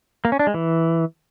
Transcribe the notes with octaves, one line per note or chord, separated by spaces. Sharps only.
A#3
C#4
D4
G#3
E3